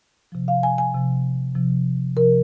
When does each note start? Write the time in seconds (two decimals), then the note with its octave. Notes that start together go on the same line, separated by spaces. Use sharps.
0.32 C3 F3
0.48 F5
0.63 G#5
0.78 G#5
0.94 C3 F3
1.55 C3 F3
2.16 C3 F3 A#4